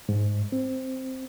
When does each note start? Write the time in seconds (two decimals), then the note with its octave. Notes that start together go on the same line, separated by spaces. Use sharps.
0.09 G#2
0.52 C4